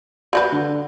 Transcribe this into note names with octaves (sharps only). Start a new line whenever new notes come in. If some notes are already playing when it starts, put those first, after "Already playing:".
G3 F#4 B4 F#5 G6
D3